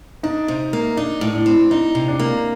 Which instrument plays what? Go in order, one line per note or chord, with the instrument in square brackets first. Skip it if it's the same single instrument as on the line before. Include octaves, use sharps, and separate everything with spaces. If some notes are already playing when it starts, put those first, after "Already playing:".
[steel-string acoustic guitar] D4 [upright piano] D#4
[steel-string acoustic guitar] C3
A#3
[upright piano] D4 [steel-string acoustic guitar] D#4
[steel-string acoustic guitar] A2
[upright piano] D4
[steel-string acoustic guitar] C4
[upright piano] D4 [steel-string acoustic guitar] D#4
[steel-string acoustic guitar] C3
[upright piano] D4
[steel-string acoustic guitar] A#3